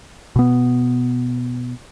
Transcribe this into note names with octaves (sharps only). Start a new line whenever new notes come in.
B2 B3